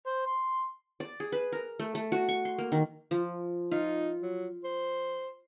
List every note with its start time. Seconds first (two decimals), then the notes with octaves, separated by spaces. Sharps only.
0.06 C5
0.26 C6
1.00 D5
1.20 G#4
1.32 B4
1.53 A#4
1.80 A3
1.95 A3
2.12 F#4
2.29 C#6
2.45 C6
2.58 A#3
2.72 D#3
3.11 F3
3.72 D#4 F4
4.22 F#3
4.64 C5